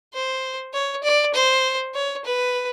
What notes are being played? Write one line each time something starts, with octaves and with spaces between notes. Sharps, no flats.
C5
C#5
D5
C5
C#5
B4